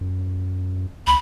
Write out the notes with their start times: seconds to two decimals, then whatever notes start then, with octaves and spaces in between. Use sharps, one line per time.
0.01 F#2
1.07 C#2 B5